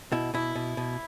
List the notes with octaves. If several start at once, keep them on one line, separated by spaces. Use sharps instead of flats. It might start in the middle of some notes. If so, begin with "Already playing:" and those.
B2 E4
B2 E4
B2
B2